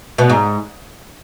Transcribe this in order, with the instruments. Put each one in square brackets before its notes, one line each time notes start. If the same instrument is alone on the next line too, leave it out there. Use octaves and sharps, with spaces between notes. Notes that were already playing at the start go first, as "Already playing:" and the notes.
[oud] B2
G#2